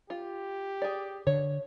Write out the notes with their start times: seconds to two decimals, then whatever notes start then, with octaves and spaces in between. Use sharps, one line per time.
0.10 F4 G4
0.82 G#4 D5
1.27 D3 C#5